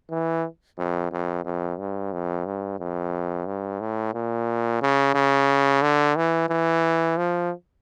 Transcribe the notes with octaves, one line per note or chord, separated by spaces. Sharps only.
E3
F2
F2
F2
G2
F2
G2
F2
G2
A2
A#2
C#3
C#3
D3
E3
E3
F3